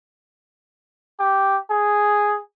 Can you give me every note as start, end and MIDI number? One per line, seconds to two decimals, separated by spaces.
1.20 1.58 67
1.70 2.38 68